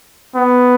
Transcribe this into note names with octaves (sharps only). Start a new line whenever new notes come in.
B3